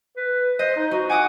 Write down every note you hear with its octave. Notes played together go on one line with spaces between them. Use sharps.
B4
C5 D#5
D#4
D#4 F#4
F#5 G#5 D6 D#6